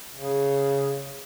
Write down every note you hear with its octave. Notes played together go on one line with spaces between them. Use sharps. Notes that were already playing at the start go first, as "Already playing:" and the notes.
C#3